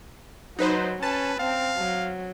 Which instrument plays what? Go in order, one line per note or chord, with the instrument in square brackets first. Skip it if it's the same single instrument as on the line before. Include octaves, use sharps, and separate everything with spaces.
[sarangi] F#3 [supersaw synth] D#4 B4 C5
[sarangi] C#4 [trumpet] B4 [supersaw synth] A5
[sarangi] C4 [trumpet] F5
[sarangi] F#3